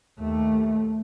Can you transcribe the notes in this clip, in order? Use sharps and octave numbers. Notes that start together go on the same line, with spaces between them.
D#2 A3